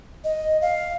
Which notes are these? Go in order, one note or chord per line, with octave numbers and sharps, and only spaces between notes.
D#5
F5